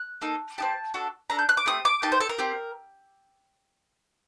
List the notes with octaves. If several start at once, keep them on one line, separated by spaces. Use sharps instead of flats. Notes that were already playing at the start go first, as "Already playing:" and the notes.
Already playing: F#6
A#3 D#4 A4
C4 D#4 G4 A5
D4 F#4 A4
D4 A4 A#5
G6
F#6
D6
A3 C4 G4 D#6
D6
A#3 D#4 G4 A5
C5
A4
A#4
C4 G4